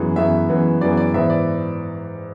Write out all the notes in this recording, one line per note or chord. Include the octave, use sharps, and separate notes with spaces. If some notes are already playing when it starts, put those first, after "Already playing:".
Already playing: F#2 E3 G#3 B3
F#2 E3 G#3 B3 E5
F#2 E3 G#3 B3
F#2 E3 G#3 B3 D5
D5
G#2 E3 B3 E5
D5